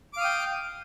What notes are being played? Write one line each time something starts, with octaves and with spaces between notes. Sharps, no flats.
F5 G5 D6 D#6